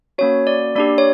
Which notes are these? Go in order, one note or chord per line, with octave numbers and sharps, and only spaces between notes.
A#3 C#4 F#4 C#5
D5
A#3 D4 G4 D5
C#5